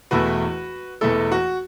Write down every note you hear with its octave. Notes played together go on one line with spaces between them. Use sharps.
E1 E2 E3 A3 E4 F#4 B4
E1 E2 E3 A3 E4 A4
F#4